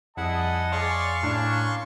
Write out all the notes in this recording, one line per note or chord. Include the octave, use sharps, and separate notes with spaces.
F2 G3 E4 G#4 D#5 F#5 A5
G#4 C#5 D5 F5 C6 C#6
A2 A#3 C#4 D4